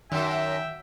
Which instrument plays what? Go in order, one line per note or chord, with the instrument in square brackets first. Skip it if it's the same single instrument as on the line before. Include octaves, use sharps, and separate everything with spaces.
[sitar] F#2 [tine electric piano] D#3 [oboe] E5 [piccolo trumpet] G5